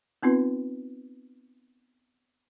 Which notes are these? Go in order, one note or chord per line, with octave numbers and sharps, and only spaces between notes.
B3 C4 D#4 F4 B4